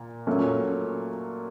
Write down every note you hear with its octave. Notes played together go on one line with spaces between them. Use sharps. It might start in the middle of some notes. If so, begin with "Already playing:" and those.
Already playing: A#2
A#2 F#3 A3 C#4